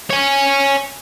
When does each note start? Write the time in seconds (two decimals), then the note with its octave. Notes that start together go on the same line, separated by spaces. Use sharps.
0.11 C#5 G#5